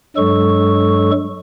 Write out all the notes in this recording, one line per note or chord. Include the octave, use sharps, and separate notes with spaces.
G2 F#3 G#3 A4 C#6